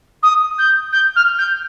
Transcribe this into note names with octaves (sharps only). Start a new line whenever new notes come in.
D#6
G6
G6
F6
G6